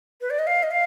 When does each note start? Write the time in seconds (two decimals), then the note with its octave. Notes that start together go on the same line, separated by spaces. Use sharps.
0.21 B4
0.30 D5
0.39 D#5
0.47 F5
0.63 D#5
0.71 F5